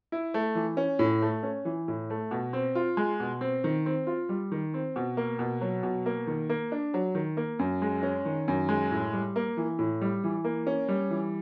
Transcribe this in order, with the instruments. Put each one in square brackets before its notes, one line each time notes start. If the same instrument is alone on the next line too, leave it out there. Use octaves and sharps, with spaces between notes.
[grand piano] E4
A3
E3
C#4
A2
A3
C#4
E3
A2
A3
B2
C4
F4
G#3
B2
C4
D#3
C4
F4
G3
D#3
C4
B2
A#3
B2
F#3
B2
A#3
D#3
A#3
D4
F#3
D#3
A#3
F#2
G#3
C#4
D#3
F#2
G#3
A2
G3
A#3
E3
A2
G3
E3
A#3
C#4
G3
E3